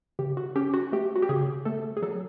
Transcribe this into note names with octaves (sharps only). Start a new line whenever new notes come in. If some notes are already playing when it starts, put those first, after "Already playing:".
C#3 G4
F#4
C#4 G4
F#4
A3 G4
F#4
G4
C#3 G#4
A3 A4
G#4
F#3 A4